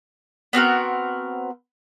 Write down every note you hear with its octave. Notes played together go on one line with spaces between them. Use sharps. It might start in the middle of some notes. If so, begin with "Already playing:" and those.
B3 C4 F#4 A#4